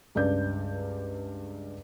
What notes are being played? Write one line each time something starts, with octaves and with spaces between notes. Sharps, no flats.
C#2 G2 D5 G6